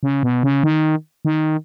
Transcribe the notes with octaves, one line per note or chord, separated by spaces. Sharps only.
C#3
B2
C#3
D#3
D#3